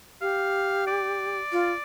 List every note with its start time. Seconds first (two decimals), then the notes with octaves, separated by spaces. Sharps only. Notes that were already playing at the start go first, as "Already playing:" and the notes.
0.21 G4 F5
0.87 D5
1.52 F4